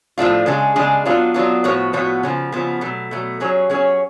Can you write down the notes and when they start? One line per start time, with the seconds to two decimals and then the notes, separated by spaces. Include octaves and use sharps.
0.18 A2 F3 A3 D4 F4
0.46 C#3 G#3 D4 G#4
0.76 C#3 G#3 D4 G#4
1.05 F#3 B3 D4 F4
1.34 F#3 B3 D4 F4
1.64 A2 F3 B3 F#4 C#5
1.93 A2 F3 B3 F#4 C#5
2.23 C#3 F3 B3
2.52 C#3 F3 B3
2.81 B2 F#3 A3
3.11 B2 F#3 A3
3.40 F#3 C#4 G#4 C#5
3.70 F#3 C#4 G#4 C#5